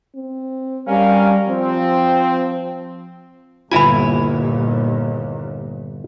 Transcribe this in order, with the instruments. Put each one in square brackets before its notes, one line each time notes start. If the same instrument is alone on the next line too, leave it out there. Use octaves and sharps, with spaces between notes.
[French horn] C4
[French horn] G3 [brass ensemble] C#4 A#4 F5
[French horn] F3 [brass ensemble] C4
[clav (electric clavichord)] G1 E4 G#5 [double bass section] D#2 A#2 [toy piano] F4 E5 B5